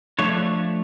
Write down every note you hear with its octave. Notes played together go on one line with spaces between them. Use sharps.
F3 A3 D4 C#5